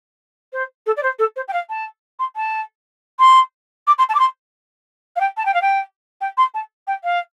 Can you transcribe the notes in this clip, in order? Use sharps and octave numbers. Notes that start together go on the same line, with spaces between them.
C5
A4
D5
C5
A4
C5
G5
F5
A5
C6
A5
C6
D6
C6
A5
D6
C6
F5
G5
A5
G5
F5
G5
G5
C6
A5
G5
F5